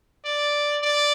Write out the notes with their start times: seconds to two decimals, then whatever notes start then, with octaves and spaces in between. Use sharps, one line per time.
0.25 D5
0.82 D5